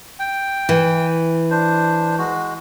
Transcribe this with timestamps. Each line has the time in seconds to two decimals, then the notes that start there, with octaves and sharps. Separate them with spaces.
0.19 G5
0.69 E3
1.51 D4 C5
2.18 G#3 F#4